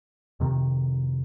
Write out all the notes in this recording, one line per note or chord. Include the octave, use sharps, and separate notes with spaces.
F2 C3 D#3